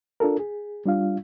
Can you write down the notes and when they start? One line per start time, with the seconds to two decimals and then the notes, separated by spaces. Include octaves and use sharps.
0.20 D4 F4 A4 A#4
0.39 G#4
0.86 G3 D4 F4 F5